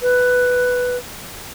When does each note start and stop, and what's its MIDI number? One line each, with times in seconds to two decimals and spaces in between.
0.01 0.97 71